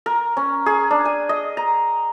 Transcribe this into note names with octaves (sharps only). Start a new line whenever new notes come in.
A#4
C#4
G#4
D4
G#5
D#5
A#5